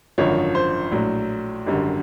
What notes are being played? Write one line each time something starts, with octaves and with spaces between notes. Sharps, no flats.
G#1 F#2 D3 F3 C#5
C5
A#1 A2 F#3
G#1 F#2 D3 G3